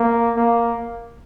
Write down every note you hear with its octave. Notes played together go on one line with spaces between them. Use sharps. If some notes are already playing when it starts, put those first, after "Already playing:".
Already playing: A#3
A#3